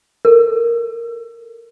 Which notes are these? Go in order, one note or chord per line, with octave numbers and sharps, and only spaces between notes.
A4 A#4